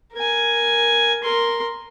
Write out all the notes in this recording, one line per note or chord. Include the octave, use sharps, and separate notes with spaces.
A#4 G#5
A#4 C6